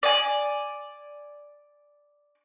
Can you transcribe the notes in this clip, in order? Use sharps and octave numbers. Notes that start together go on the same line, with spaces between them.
D5 G#5